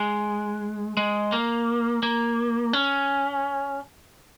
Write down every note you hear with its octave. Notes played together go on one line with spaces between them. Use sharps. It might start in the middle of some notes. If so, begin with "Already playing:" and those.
Already playing: G#3
G#3
A#3
A#3
C#4